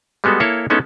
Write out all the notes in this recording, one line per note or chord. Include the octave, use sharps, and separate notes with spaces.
G3 G#3 B3 F#4 A4
A#3 E4 A4 C#5 F5
G#3 B3 C#4 D#4 E4 A4